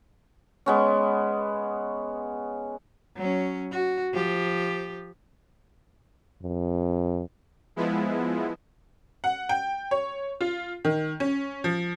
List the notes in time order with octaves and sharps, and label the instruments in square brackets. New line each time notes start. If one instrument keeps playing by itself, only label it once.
[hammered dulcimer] G#3 B3 C#4
[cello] F#3 C#4
F#4
F3 G4
[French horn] F2
[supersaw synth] F3 G#3 B3 E4
[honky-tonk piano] F#5
G5
C#5
F4
D#3
C#4
F3